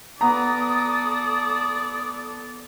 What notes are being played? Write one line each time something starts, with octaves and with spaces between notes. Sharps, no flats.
B3 A4 D5 A#5 D#6